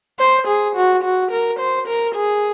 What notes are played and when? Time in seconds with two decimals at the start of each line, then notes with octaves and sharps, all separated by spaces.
0.19 C5
0.47 G#4
0.76 F#4
1.03 F#4
1.31 A#4
1.59 C5
1.88 A#4
2.15 G#4